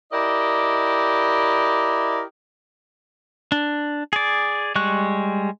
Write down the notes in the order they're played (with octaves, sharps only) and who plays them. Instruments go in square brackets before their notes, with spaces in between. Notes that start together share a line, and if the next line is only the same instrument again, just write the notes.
[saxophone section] E4 G4 A#4 D5 D#5
[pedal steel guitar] D4
G#4 D5
G3 G#3 C#6 F#6